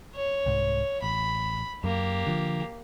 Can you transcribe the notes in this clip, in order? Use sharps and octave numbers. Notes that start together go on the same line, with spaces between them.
C#5
C2 G#2
A1 B5
F#2 A#3 G4
D3 F3